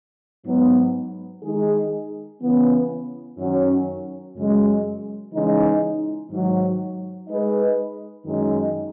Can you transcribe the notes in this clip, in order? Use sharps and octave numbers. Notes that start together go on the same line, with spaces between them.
G#2 F#3 B3
D#3 G#3 D#4 G#4
C#3 E3 B3
F#2 D#3 F#3 C#4 F#4
F#2 C#3 G#3
C#3 E3 G#3 D#4
G#2 D#3 F#3
G#3 D#4 G#4 B4 D#5
F#2 D#3 G#3 D#4